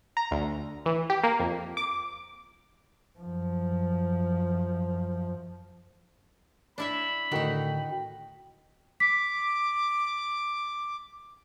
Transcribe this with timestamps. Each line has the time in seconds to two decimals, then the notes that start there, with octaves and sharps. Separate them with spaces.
0.17 A#5
0.31 D2
0.86 E3
1.10 G4
1.23 A#3
1.39 F2
1.77 D6
3.19 F#2 F3
6.78 D4 E4 E5 B5
7.32 A2 D3 D#3 D#4 F#4 G5
9.00 D6 B6